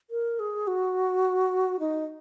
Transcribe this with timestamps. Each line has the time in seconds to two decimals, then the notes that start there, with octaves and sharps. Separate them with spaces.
0.10 A#4
0.39 G#4
0.67 F#4
1.80 D#4